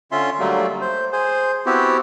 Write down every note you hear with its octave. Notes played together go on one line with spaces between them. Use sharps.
D3 C#4 F4 E5 C6
D3 F#3 G3 A3 A#3
C5
G#4 C5
B3 C4 E4 F#4 G4